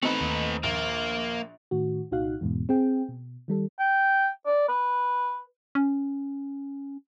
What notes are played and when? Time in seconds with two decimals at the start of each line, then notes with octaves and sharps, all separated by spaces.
0.03 A3 C4 D#4 B4
0.21 D#2
0.63 A#1 A#3
1.71 A2 D#3 F#4
2.11 C2 A#2 D#4 F#4 F5 F#6
2.41 E2 G#2 B2
2.69 C4 G#4 G5
3.09 B2
3.48 D#3 G3 A4
3.79 G5
4.46 D5
4.68 B4
5.75 C#4